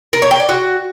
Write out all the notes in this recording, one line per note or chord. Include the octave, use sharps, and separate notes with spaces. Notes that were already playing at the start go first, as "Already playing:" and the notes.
A#4
C#5
G5
D5
F#4